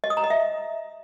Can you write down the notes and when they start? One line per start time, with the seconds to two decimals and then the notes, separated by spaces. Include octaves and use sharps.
0.04 D#5
0.10 D#6
0.17 A#5
0.24 D#5
0.30 E5